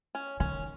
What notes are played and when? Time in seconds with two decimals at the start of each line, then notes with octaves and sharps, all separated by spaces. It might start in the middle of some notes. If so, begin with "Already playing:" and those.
0.15 C#4
0.40 D#3 C#4